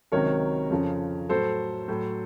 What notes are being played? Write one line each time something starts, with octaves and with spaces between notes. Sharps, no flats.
C#2 C3 D#3 F#3 A#4 C#5
F2 C#3 F3
A2 F#3 A4 C5
A2 F#3